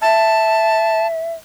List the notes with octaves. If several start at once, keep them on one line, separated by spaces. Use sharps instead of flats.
E5 A5